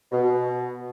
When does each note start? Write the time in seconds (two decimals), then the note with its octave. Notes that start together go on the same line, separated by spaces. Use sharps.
0.12 B2